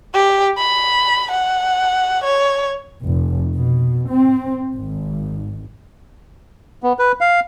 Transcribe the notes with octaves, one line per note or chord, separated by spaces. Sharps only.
G4
B5
F#5
C#5
F1
B2
C4
G#1
B3
B4
F5